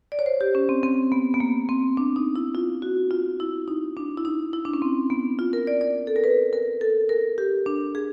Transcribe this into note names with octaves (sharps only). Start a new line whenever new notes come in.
D5
C#5
C5
G4
C#4
C4
C4
B3
B3
A#3
C4
D4
D#4
E4
F4
F#4
F4
E4
D#4
D4
E4
D#4
E4
D4
C#4
C4
B3
F4
A#4
D5
D5
A4
A#4
B4
A#4
A4
A#4
G4
D4
G#4